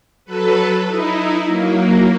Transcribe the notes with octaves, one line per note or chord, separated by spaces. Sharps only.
F#3 A4 B4
D#4 E4
F#3 A#3